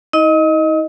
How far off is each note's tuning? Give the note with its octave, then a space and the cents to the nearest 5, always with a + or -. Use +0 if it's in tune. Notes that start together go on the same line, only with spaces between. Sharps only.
D#4 +45 D#5 +0